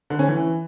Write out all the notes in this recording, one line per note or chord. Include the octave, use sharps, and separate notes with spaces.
D3
C#4
E3